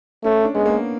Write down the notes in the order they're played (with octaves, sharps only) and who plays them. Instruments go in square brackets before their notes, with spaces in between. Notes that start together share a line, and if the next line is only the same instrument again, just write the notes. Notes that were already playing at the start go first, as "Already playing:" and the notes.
[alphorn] A3 [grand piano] C#4
[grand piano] D4
[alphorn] G#3 [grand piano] B3
[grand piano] A#3